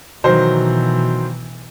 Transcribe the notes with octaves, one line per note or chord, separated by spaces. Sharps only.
B2 D#3 E3 F#3 C5